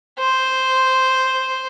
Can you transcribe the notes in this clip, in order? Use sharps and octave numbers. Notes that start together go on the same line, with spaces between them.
C5